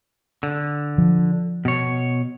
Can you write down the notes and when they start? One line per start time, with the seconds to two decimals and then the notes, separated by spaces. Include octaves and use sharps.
0.43 D3
0.98 F3
1.65 B2 C#5